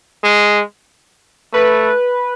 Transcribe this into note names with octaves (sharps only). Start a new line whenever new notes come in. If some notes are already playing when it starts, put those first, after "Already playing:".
G#3
A3 B4